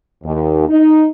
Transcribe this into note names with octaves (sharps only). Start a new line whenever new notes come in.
D#2
D#4